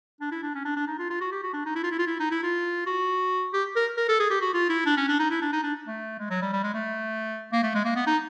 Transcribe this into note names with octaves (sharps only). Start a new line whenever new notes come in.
D4
E4
D4
C#4
D4
D4
D#4
F4
F4
F#4
G4
F#4
D4
D#4
E4
F4
E4
F4
E4
D#4
E4
F4
F#4
G4
A#4
A#4
A4
G#4
G4
F#4
F4
E4
D4
C#4
D4
D#4
E4
D4
D#4
D4
A3
G#3
F#3
G3
G3
G#3
A3
A#3
A3
G#3
A#3
B3
D#4